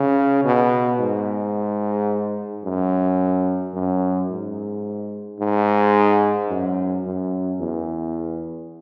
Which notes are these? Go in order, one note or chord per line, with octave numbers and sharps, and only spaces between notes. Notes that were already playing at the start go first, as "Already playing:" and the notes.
Already playing: C#3
B2
G#2
F#2
F#2
G#2
G#2
F#2
F#2
E2